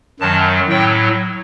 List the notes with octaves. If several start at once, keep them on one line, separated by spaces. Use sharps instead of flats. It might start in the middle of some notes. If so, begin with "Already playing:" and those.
F#2 D#3 F#3 A5
A2 F#3 G5